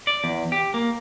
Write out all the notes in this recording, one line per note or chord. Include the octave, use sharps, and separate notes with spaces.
D5
E2
G4
A#3